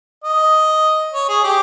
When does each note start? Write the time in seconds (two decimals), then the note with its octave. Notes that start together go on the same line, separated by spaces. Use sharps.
0.24 D#5
1.13 C#5
1.28 G#4
1.44 G4